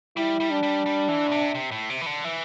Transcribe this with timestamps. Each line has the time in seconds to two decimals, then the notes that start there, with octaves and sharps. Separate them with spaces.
0.16 G3 E4
0.40 G3
0.51 D4
0.63 G3
0.86 G3
1.09 E3
1.27 A2
1.32 C3
1.55 C3
1.71 A2
1.90 C3
2.01 E3
2.06 D3
2.25 E3